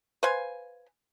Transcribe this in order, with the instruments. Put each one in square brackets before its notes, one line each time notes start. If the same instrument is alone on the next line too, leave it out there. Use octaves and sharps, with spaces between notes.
[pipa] B4 C5 F5 G#5